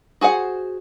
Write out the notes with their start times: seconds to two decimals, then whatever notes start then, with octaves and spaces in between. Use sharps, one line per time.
0.21 F#4 G#4 C5 F#5